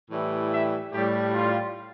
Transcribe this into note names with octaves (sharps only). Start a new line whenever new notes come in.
A2 E3 G3
E5
A2 G3 G4
F4